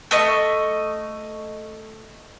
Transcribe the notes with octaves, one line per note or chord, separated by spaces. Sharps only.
A3 D#5 C#6